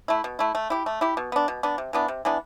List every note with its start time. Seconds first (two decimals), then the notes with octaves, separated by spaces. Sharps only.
0.08 A3 E4
0.24 B2
0.39 A3 E4
0.55 A3
0.70 E4 G4
0.86 A3
1.01 E4 G4
1.17 B2
1.32 B3 D4
1.48 B2
1.63 B3 D4
1.78 C3
1.93 E3 B3 D4
2.08 C3
2.25 E3 B3 D4